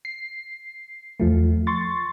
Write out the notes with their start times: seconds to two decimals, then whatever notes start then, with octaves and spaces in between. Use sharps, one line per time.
0.05 C7
1.20 E2 F3 A3
1.67 C6 C#6 A6